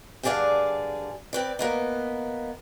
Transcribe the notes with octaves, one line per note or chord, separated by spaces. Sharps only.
G2 D3 G#4 D5 F5 F#5
C4 B4 D5
A#3 B3 D#4